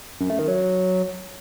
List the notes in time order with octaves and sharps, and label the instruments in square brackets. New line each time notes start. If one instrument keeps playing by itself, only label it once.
[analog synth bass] F#2
A3
D#3
F#3